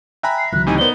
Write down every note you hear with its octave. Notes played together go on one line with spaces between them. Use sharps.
E5 G5 G#5 A#5 B5 F#6
C7
C#2 D3 E3 F#3 F#6
A2 C3 D#4 G#5
B3 D#4 A#4 C5 D5 G7